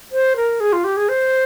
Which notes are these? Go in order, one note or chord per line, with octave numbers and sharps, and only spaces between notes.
C5
A#4
G#4
F4
G4
G#4
C5